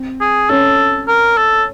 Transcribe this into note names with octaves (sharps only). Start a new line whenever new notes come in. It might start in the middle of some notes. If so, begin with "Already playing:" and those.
Already playing: C4
G#4
C#4 A4
A#4
A4